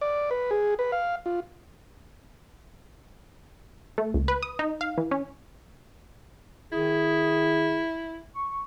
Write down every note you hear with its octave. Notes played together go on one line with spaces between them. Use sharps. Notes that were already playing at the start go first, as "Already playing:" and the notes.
D5
B4
G#4
B4
F5
F4
A3
C#2
B4
D#6
D#4
F5
E3
C#4
D#3 E4 G#4
C#6